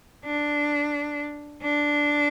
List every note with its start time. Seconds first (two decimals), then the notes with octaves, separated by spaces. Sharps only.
0.25 D4
1.63 D4